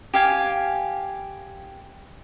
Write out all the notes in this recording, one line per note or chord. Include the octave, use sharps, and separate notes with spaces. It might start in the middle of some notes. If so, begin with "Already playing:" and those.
G4 F5 G#5